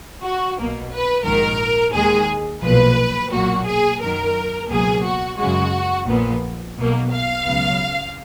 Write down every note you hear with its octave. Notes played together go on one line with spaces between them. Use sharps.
F#4
B1 B2 A#3
B4
A#1 G#2 D#3 A#4
D#2 D#3 G#3 G#4
B1 A#2 F3 B4
B1 A#2 F#3 A#3 F#4
G#4
F#2 D#3 F#3 A#4
C#2 B2 F#3 A#3 G#4
F#4
F#2 C#3 G#3 F#4
A#1 A#2 F3 B3
B1 B2 A#3
F5
C#2 C#3 F#3 B3